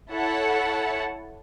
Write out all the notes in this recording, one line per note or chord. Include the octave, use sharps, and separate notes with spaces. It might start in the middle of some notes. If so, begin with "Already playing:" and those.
E4 A4 C#5 F#5 A5